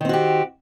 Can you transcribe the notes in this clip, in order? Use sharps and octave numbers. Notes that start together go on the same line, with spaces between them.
D#3 C4 F#4 G4